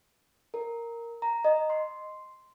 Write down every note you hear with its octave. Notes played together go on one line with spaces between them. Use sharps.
A#4
A#5
D#5
C6